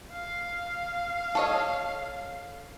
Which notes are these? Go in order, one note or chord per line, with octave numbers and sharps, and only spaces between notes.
F5
A4 C#5 D#5